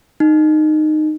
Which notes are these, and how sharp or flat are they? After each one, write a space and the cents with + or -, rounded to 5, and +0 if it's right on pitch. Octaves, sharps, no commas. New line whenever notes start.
D#4 -15